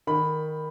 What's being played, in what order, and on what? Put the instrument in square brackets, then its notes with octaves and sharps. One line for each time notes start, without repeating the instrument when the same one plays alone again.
[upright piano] D#3 B5